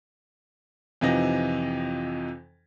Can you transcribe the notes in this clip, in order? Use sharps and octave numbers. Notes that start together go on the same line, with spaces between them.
F2 C3 E3 F3 D#4 A#6